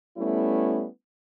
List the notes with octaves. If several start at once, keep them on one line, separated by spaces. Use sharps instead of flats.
G3 A3 B3 C#4 E4